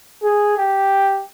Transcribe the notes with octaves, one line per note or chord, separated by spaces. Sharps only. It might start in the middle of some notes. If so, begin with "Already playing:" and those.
G#4
G4